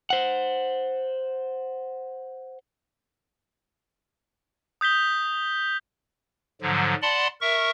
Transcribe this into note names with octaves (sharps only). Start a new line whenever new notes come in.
C5 F#5
D#6 G6 B6 G7
G#2 D3 F3 F#3
D5 F#5 A5 B5 C6
A#4 E5 C#6